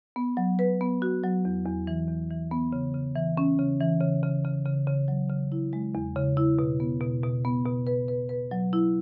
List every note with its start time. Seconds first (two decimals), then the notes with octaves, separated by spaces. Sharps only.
0.16 B3
0.37 F#3
0.59 B4
0.81 B3
1.02 F#4
1.24 F#3
1.45 E2
1.66 E2
1.87 E3
2.09 E2
2.30 E3
2.51 B3
2.73 C#3
2.94 C#3
3.16 E3
3.37 C#4
3.59 C#3
3.81 E3
4.01 C#3
4.23 C#3
4.45 C#3
4.65 C#3
4.87 C#3
5.08 F#3
5.30 C#3
5.52 E4
5.73 G#3
5.95 E2
6.16 C#3
6.37 E4
6.59 B2
6.80 B3
7.01 B2
7.23 B2
7.45 B3
7.65 B2
7.87 B4
8.08 B4
8.29 B4
8.51 F#3
8.73 E4